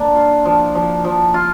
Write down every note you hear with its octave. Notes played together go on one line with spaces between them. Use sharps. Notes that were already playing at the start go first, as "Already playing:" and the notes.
Already playing: A#3 D4
F4
F3
F3
F3
F4